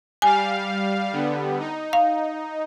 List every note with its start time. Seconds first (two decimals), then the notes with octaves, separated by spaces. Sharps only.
0.22 G3 F5 G#5
1.13 D3 G3 B3
1.59 D#4
1.93 F5